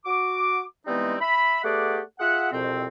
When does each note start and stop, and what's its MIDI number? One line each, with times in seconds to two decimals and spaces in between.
0.05 0.62 66
0.05 0.62 86
0.87 1.15 52
0.87 1.15 55
0.87 1.15 56
0.87 1.15 59
0.87 1.15 60
0.87 1.15 63
1.21 1.62 76
1.21 1.62 83
1.64 2.00 57
1.64 2.00 59
1.64 2.00 67
1.64 2.00 68
1.64 2.00 74
1.64 2.00 78
2.20 2.50 65
2.20 2.50 68
2.20 2.50 76
2.20 2.50 78
2.52 2.86 36
2.52 2.86 41
2.52 2.86 47
2.52 2.86 60